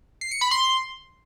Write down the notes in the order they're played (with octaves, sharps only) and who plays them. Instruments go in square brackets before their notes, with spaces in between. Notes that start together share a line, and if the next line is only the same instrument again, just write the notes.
[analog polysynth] C7
C#7
B5
C6